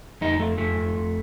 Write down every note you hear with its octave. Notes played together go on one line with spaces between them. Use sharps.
F2 D#4
F2 A3
F2 A3
F2
F2